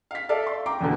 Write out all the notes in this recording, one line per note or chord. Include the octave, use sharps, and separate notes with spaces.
F5 B6
A4 D5 E5 F5
C6
G5 A#5 D6
E2 B2 D3